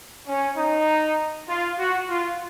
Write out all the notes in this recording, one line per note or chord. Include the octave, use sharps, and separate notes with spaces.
C#4
D#4
F4
F#4
F4